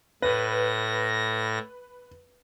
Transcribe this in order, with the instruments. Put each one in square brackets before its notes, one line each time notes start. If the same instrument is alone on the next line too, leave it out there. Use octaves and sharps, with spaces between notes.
[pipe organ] A2 A#6 [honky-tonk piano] B4